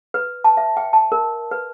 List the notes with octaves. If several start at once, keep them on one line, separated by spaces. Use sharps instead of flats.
B4
A5
E5
G5
A5
A#4
B4